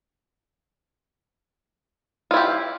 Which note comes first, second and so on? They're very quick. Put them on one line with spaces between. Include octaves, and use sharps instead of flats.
F4 E4 G4